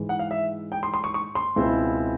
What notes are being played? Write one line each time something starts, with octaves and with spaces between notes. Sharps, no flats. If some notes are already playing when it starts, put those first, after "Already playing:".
Already playing: G#2 E3 G#3
F#5
F5
E5
G5
C6
C6
C#6
C#6
C6
C#2 B2 G#3 C4 E4